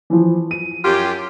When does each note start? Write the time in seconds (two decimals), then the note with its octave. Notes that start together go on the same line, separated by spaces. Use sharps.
0.10 E3 F3
0.51 D#7
0.85 F#2 F4 G4